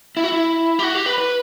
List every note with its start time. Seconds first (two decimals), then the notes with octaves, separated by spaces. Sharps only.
0.17 E4
0.24 F#4
0.32 E4
0.79 G4
0.84 F#4
0.95 G4
1.06 B4
1.18 B4